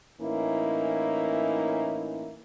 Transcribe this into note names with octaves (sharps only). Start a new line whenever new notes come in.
A2 E3 A#3 C#4 D#4 E4